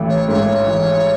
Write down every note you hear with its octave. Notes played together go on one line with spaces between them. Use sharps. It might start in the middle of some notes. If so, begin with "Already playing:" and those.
Already playing: A1 A3
C#5
G#2 C#5
E3